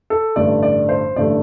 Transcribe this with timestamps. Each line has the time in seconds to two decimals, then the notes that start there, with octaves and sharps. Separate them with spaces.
0.10 A4
0.36 A1 G2 D3 A3 D5
0.63 D5
0.89 C5
1.15 A1 G2 D3 A3 D5